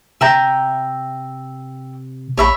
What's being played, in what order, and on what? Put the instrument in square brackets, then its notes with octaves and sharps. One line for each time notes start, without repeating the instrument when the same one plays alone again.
[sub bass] C3 [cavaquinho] E5 G5 A#5
[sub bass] A#1 [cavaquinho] C#5 E5 B5